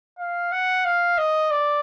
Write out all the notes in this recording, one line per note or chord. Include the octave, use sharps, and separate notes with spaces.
F5
F#5
F5
D#5
D5